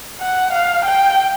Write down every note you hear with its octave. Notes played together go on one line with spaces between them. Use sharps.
F#5
F5
G5